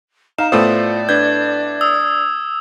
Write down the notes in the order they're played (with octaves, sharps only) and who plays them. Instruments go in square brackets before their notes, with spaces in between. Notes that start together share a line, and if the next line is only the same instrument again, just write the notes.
[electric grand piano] D#4 [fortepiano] F5 [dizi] A#5 [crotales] E7
[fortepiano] A2 A3 B3 [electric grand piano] F4 C5 D#6 [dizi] D5
[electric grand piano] D4 B4 G6 [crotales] G#6
[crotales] D#6 E6